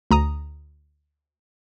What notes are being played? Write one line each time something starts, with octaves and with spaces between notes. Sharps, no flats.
D2 A#5 D#6